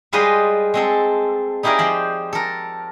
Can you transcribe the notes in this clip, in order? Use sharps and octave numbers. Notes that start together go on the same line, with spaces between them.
G3 G#3 F4 B4 C5 D#5
G#3 C4 A4
D#4 E4 G4 G#4 A#4 D5
F3 C5 B5
A4 A#4